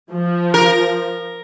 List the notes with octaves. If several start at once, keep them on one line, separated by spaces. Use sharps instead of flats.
F3
A#4